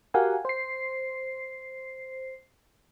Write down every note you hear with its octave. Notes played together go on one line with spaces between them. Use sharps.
F#4 G4 A#4 F5 F#5 G#5
C5 C7